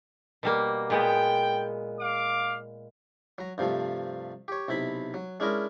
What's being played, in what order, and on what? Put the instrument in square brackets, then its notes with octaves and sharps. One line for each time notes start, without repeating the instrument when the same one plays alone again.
[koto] B2 G3 A#3
[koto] A#2 G#3 B3 [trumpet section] G5
[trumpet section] F5 D6
[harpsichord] F#3 A#5
G2 C3 F3 A3
G4 C#5
B1 C3 E4 B5
F#3
G#3 C#4 D4 E4 A#4 D#5